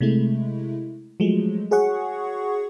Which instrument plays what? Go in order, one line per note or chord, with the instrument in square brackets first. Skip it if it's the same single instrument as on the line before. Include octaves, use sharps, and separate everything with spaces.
[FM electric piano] C3 G#3 A3 E4
F3 F#3 G#3 A3
F#4 G#4 C#5 F#5 C#6